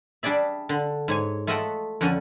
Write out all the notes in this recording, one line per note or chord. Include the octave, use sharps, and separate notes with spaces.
G3 D4 G#4 D5 E5
D3
G#2 C#5 G#5
A3 F4 D#5 E5 F#5 G5
F2 D3 F3 C#4